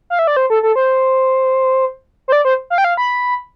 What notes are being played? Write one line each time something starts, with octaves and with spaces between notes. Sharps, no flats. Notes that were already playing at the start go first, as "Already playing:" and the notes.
F5
E5
D5
C5
A4
A4
C5
C5
D5
C5
F5
G5
F5
B5